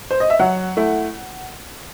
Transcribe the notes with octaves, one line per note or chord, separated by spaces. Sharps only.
C5
D#5
E5
F#3 F#5
A3 E4